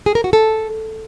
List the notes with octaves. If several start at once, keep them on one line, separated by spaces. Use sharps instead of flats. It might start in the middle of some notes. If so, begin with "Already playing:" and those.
G#4
A#4
F#4
A4